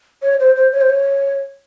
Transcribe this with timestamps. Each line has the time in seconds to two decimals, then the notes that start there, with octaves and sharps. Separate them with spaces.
0.22 C#5
0.40 C5
0.56 C5
0.72 C#5
0.81 C5
0.90 C#5